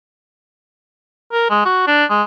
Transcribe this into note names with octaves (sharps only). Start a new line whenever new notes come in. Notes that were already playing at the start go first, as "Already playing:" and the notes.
A#4
G#3
F#4
D4
G#3